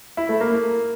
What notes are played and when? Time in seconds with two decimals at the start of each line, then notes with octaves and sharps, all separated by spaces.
0.17 E4
0.29 A3
0.41 A#3